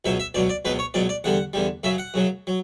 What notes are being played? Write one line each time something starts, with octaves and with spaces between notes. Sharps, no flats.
C#2 B2 F#3 E5
E5
C#2 B2 F#3 D5
D5
C#2 B2 F#3 B4
C#5
C#2 B2 F#3 D5
D5
E2 D3 G3 F#5
E2 D3 G3
F#2 C#3 F#3 E5
F#5
F#2 C#3 F#3
F#3